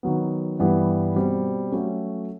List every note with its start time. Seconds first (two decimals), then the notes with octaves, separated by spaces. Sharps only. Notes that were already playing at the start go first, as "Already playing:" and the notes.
0.03 D#3 F#3 B3
0.59 G2 E3 G3 B3
1.16 B2 G3 C4
1.72 F#3 A3 C#4